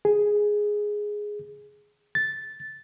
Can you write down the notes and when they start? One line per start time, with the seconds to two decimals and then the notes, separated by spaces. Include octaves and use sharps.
0.05 G#4
2.15 A6